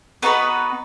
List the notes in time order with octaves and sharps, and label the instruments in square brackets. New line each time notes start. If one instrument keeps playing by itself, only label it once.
[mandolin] B3 D#4 F#4 B4